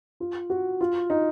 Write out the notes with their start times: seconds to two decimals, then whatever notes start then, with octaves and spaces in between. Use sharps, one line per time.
0.20 F4
0.50 F#4
0.81 F4
1.10 D#4